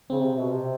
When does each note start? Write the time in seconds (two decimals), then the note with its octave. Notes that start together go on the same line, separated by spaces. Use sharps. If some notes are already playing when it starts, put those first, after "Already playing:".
0.10 C#3 C4
0.23 C3
0.38 B2
0.51 C3